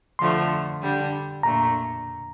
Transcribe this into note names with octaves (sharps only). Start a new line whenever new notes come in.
D3 F3 A3 C6
D3 G3 D4
A#2 A3 D4 A#5